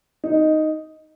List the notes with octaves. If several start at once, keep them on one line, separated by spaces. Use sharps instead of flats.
D#4